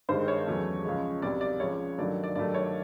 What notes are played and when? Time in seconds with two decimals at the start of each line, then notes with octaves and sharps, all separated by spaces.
0.09 G2 D#3 G#3 C5
0.28 C#5
0.46 E2 C#3 F#3 A3
0.84 C#2 C#3 F3 G#3
1.22 C2 B2 G3 D5
1.41 D5
1.60 C#2 C#3 F3 C#5
1.98 G2 D#3 F#3 A3 D5
2.24 D5
2.35 G2 D#3 F#3 A3 D5
2.54 C#5